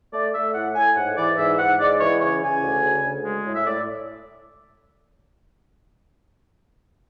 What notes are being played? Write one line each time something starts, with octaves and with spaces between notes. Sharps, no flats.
A3 D5
A3 E5
A2 F#5
A2 G#5
G#2 F#5
E3 D5
G#2 E5
G#2 F#5
G#3 D5
E3 C#5
C#3 C#5
C#3 G#5
D2
C#3
D2
G#3
A2
E5
A2 D5